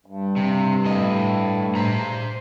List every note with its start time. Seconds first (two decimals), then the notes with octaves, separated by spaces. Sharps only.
0.06 G2
0.36 C3
0.85 A2 D#5
1.75 C5 A#5